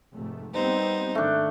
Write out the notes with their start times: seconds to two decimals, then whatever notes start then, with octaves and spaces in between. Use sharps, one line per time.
0.13 F1 G#2 A3
0.54 G3 B3 C4 D#4 C5
1.15 G#2 D#3 A3 D4